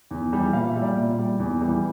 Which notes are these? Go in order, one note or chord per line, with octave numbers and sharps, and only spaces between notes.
E2
E3 G3
A#2 F5
E5
G3
D5
A#2
G3
E2
E3 G3